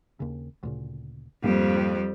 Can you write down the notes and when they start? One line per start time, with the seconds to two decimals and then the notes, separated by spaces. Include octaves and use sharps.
0.20 D#2 C#3
0.63 D2 A#2 C#3
1.44 F2 G#2 G3 A#3 C4